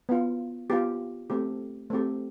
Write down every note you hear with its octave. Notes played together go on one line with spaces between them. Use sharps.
B3 F4
B3 F4 G4
A3 C4 G4
A3 C4 G4